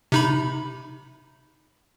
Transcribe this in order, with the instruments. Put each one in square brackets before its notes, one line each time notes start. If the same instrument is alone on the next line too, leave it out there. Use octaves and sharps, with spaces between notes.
[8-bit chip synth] C3 D#4 B5